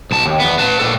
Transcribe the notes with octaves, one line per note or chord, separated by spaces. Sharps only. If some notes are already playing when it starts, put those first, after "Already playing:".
B1 A5
D#2
E2 B3
B4 A5
A#2 A4